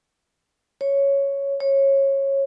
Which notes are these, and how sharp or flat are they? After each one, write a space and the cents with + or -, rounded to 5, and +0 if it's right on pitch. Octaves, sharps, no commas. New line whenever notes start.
C#5 +0
C#5 -20